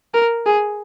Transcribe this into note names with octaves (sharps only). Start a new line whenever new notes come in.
A#4
G#4